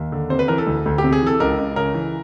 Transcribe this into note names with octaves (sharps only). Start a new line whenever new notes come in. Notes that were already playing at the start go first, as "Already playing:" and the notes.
Already playing: D#2
D3
C3 C5
B4
E3 A#4
A4
D2
D2
G4
C3
G#4
E3 A4
C#2 A#4
C#2
C#3 A#4
E3